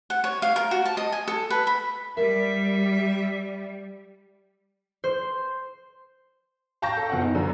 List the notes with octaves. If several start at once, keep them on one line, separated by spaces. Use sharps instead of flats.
F#5
C#5
F5
A#4
F#4
A5
D#5
G#5
A4
B4
B5
G3 A#4 E5
C5
F5 G5 A5 C#6 G6 A#6
A4
F#1 B2 F4 F#5
D#4
F#2 B2 D3